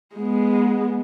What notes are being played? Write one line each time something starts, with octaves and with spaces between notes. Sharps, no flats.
G#3 B3